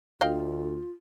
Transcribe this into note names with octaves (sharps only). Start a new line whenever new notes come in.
D2 F4 D#5 F5 G5